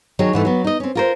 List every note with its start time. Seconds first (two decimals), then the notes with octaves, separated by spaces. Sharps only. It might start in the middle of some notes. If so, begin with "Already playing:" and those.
0.19 D#3 F#3 D#4 G#4 C#5
0.33 G#2 E3 A3
0.45 F#3 B3
0.64 D#4 D#5
0.80 C4 C#4
0.95 F4 A#4 C5